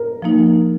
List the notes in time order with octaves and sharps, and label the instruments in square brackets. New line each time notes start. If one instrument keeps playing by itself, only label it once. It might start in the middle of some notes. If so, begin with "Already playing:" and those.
Already playing: [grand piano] A#4
[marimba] F3 A#3 D#4